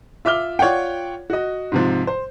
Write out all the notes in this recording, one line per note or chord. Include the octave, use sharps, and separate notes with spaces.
F4 E5 D6 F6 G7
F4 C#5 D5 F#5 G5
F#4 D#5
G#2 C3 F3
C5